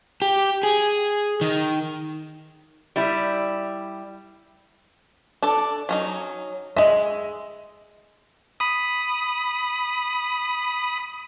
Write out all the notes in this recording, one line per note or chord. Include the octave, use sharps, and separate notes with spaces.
G4
G#4
D#3
G3 E4
D4 A4 D5
F#3 C#4 D#4
G#3 D#5 E5
B5 D#6